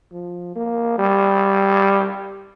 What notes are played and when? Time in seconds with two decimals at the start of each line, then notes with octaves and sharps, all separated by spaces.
0.12 F3
0.55 A#3
0.98 G3